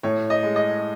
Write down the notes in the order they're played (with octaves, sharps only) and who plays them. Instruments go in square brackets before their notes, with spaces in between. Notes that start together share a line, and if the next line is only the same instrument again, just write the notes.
[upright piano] A2 C#5
D#5
G#3
D#5